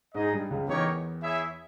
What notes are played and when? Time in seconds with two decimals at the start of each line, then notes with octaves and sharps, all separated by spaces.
0.14 G#2 G#3 D#4 G#4 D#5
0.33 G2 G3
0.51 C#2 C#3
0.68 E2 E3 D#4 G4 A#4 C#5
1.23 E4 G#4 C#5 E5